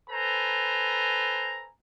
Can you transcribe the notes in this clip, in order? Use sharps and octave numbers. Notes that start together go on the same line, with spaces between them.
A4 B4 C5 G#5 A#5